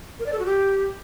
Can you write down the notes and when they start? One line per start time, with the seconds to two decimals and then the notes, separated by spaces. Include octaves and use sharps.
0.19 A#4
0.26 D5
0.33 A4
0.39 F#4
0.46 G4